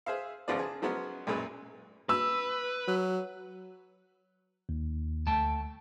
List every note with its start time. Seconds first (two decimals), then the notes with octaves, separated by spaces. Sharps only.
0.06 G#4 C5 E5 F5
0.48 G#1 C#3 F3 B3 F4 D5
0.59 G#4 A5
0.82 F3 F#3 G#3 B3 C#4
1.27 B1 F#2 A#2 G#3 B4
2.09 B4 E6
2.88 F#3
4.69 D#2
5.27 D2 A3 G5 A5